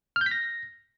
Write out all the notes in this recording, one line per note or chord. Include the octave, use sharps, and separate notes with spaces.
F6
G6
B6
A#6